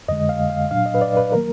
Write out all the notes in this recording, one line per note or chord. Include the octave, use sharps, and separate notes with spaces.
F2 D3 G#3 D#5
F5
F5
A#2 F#3 D4 F5
D#5
B4
D5
B4
D#3 F#3 A#3 A#4